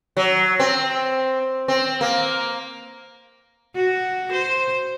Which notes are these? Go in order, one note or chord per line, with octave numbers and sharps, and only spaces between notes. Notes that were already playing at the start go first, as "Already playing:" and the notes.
F#3
C4
C4
A#3
F#4
C5